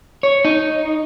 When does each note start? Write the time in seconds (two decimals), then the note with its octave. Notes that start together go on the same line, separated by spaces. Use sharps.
0.23 C#5
0.45 D#4